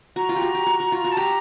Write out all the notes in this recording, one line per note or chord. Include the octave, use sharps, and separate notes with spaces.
F#4 A#5
F4
G4
F#4
G4
F#4
F#4
F4
F#4
A5
G4 A#5